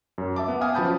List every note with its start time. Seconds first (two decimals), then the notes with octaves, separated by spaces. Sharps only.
0.18 F#2
0.36 E5 A5 D6
0.48 B3
0.61 E5 F5 G5 G#5 D#6 F6
0.75 F3 F#3 C#4 A5 B5 G6